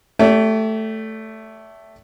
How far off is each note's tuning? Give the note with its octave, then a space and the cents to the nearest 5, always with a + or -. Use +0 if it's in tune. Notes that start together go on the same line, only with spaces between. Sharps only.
A3 +0 G4 -15 D5 -45